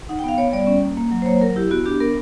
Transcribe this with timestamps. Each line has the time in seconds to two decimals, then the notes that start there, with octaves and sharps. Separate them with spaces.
0.09 D#4 F#5
0.19 G5
0.24 B3 F5
0.38 B3 C#5
0.52 G3 D5
0.67 C#4
0.83 A#3
0.97 A#3
1.12 F#3
1.22 C5
1.26 A#3 C#5
1.41 F#3 A#4
1.56 E4 G4
1.71 B3 F#4
1.85 D4 G4
2.00 B3 A#4